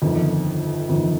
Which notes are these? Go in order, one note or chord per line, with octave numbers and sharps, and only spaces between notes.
G1 F2 D#3
G1 F2 D#3